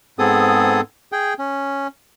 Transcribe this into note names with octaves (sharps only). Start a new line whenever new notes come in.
G#2 B3 C4 G#4 A4 D#6
G#4 G5
C#4